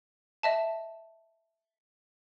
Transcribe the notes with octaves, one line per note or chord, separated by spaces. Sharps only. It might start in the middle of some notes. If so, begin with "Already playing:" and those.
D#5 E5 A5